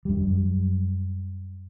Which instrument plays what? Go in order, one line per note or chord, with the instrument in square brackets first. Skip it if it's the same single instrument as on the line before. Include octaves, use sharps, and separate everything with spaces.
[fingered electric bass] F#2 G3